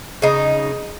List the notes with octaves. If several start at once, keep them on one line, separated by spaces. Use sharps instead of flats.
C#3 D#4